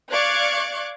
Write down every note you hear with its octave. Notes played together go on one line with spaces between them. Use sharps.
D5 F5 C#6 D6 F#6 G#6